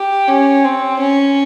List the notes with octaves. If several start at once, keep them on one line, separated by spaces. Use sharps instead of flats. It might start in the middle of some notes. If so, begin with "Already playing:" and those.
Already playing: G4
C#4
C4
C#4